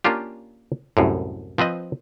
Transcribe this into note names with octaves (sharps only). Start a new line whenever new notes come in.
A#3 C#4 D4 F4 G4
C2 F#2 A2
F3 C4 B4 D#5